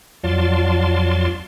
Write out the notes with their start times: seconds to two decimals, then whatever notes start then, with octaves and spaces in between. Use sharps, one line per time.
0.24 F2 F#3 F4 D5 A5 C6